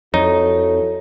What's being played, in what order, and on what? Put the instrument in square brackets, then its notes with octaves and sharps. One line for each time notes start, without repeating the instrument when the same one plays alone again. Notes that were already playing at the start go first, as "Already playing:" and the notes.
[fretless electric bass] F2 [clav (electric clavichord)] D#4 [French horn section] E4 F#4 A4 [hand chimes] C#5